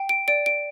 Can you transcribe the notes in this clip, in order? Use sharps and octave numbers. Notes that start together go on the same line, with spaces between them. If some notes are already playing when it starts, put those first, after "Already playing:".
Already playing: G5
D7
D5 D7
D7